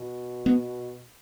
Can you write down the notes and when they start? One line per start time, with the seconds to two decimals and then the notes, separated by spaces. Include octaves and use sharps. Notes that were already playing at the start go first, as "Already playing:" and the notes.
Already playing: B2
0.46 B3